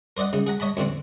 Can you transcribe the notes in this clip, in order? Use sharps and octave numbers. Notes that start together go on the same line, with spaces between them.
A#4 C5 D5 D#5 F#5
C#3 D#4
G#4 F#5 A#5
C#5 D#5 A5 B5
F2 A2 D3 C4